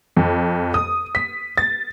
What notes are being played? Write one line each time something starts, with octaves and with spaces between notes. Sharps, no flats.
F2
D#6
B6
A6